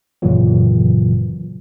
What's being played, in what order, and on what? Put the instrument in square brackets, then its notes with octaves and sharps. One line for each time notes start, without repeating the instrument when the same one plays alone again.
[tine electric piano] G#1 F#2 A#2 C#3 E3 F#3